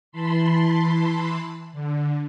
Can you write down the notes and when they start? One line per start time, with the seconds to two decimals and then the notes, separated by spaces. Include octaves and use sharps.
0.12 E3 A5 B5 C6
1.72 D3